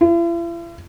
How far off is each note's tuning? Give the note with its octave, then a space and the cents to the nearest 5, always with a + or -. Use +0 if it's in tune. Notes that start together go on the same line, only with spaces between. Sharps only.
E4 +45